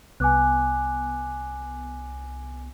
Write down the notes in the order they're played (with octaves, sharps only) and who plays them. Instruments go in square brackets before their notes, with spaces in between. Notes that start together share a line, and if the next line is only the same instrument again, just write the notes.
[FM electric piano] C2 B3 [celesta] G#5 D6 F#6